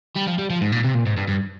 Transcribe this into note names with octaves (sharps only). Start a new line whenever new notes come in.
G3
F3
G3
F3
G#2
A#2
C3
A#2
G#2
G2
G2